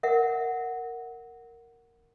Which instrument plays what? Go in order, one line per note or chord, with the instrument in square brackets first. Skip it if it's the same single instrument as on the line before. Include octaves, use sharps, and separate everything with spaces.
[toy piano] A#4 E5 F#5